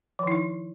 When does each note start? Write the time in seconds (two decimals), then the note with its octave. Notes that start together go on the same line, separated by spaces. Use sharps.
0.19 F3
0.23 D#3
0.27 E4
0.32 D#4